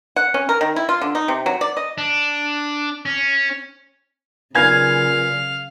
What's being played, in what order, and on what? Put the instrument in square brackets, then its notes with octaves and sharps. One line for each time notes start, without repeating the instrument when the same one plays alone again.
[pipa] F#5
C#4
A#4
D#3
E4
F4
D3
D#4
C3
F#3
D5
D#5
[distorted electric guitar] D4
C#4
[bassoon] A#2 [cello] C#3 F#3 [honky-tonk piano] B4 G#5 G#6 [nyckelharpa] F5